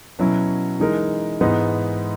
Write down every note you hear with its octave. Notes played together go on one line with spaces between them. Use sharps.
B2 F#3 C#4 E4
E3 G#3 D#4 A#4
G#2 E3 G#3 B3 D#4